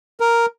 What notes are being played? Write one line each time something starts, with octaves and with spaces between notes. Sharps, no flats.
A#4